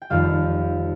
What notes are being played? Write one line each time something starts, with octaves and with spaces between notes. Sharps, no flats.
G5
F1 F2 D#3 G3 F5